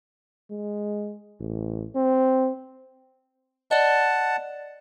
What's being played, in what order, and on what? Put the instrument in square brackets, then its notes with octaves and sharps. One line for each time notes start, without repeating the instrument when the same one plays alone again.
[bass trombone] G#3
A1
C4
[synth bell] D5 D#5 [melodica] F#5 A5